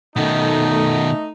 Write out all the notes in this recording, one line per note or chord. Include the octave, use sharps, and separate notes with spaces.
B2 D#3 A3 D#4